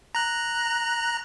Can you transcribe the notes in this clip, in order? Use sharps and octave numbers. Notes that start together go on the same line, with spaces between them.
A#5 F#6